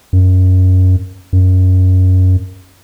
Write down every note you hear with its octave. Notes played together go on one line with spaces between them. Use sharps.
F#2
F#2